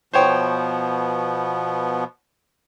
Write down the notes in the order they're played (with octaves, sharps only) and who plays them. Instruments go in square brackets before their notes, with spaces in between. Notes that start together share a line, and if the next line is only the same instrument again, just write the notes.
[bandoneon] B2 F3 B3 [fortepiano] C5 C#5 G5